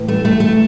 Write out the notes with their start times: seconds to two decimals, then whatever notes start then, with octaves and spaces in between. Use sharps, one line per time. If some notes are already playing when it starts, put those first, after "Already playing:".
Already playing: A2 E3
0.08 A3
0.25 A3
0.40 A3